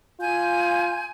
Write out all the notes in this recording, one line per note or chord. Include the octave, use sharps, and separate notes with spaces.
F4 G#5 G6